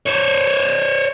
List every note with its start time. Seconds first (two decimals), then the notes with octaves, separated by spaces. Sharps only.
0.06 C5 C#5